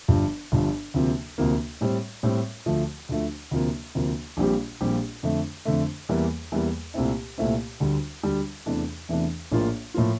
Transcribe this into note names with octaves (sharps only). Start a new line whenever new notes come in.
G1 G2 F3
G1 G2 F3
D2 C3 F3 A#3
D2 C3 F3 A#3
A2 G3 C4
A2 G3 C4
D2 D3 F3 A3
D2 D3 F3 A3
D2 C3 F3 A#3
D2 C3 F3 A#3
A#1 A#2 G3 C4 G4
A#1 A#2 G3 C4 G4
F2 D3 A3
F2 D3 A3
E2 E3 G3 A#3
E2 E3 G3 A#3
C2 A#2 A3 C4 E4
C2 A#2 A3 C4 E4
D2 D3 G3
D2 D3 G3
E2 C3 E3 A3 D4
E2 C3 E3 A3 D4
A#1 A2 F3 A#3 F4
A2 F3 A#3 F4